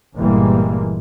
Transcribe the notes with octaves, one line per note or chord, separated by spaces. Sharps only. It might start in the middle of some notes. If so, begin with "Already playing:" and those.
G1 A#2 E3 G3 G#3 A#3